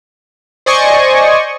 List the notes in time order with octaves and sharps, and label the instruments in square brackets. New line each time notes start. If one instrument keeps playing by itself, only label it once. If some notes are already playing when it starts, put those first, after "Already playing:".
[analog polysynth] C5 D5 D#5 G#5 C#6